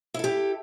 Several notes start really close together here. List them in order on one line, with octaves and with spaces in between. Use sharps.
E4 A4 G4